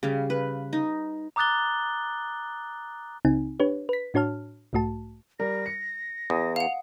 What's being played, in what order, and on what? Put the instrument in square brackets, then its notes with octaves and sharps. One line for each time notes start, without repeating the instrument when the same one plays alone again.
[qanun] C#3 G3 F5
B4
D#4
[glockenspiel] A#5 D6 D#6 F#6 A6 G7
[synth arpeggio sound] C#2 C#3 C4 D#4 G#5
D4 G4 B4 C#5
B4 B6
A2 D4 F#4 C#5 A5 F6
B1 G#2 A3 F#4 A5
[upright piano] G3 A#4 [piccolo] A#6
[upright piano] C#7
[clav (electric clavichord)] E2 [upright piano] D#6
[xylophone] F5 F#5 [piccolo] F7